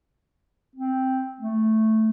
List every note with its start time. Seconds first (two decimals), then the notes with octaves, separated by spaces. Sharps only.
0.76 C4
1.41 A3